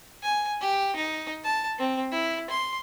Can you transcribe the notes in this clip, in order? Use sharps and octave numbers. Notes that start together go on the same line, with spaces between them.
G#5
G4
D#4
A5
C4
E4
C6